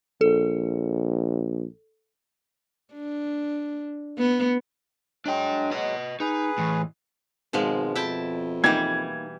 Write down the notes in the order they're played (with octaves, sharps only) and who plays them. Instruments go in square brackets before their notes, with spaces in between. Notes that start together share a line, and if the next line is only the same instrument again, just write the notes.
[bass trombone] A#1 [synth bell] A4
[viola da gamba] D4
B3
[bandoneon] F#3 G#3 [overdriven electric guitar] D4 G5
[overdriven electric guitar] B4 D#5
[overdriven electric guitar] D#4 [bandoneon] G#4 B4
[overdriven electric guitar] A2 E3
[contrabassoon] G#1 [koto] B2 F3 G#3
[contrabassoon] F2 [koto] E4 G5 A5
[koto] E3 G3 [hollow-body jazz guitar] A#3 D#4 G5 [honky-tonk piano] G#6